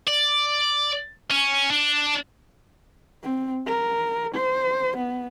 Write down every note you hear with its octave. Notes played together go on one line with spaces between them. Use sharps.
D5
C#4
D4
C4
A#4
C5
B3